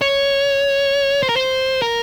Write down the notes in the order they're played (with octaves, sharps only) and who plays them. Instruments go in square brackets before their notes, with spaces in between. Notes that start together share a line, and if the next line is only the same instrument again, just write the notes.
[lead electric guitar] C#5
C5
A#4
C5
A#4